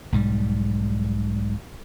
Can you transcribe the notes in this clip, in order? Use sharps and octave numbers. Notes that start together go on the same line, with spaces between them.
B1 G#2 G3